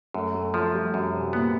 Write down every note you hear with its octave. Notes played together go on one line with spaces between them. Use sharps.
F#2 A3
A3
F3 A3
G3
F#2 F#3
C3
A#2 B3